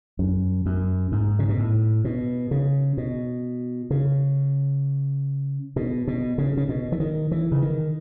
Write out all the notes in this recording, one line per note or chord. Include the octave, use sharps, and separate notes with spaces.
F#2
F#2
G#2
C#3
B2
A2
B2
C#3
B2
C#3
B2
B2
C#3
C#3
B2
E3
D#3
E3
C#3
D#3